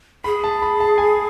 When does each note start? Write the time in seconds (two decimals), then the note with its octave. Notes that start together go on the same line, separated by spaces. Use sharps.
0.24 G#4 B5
0.44 A5
0.62 B5
0.80 A5
0.98 G#5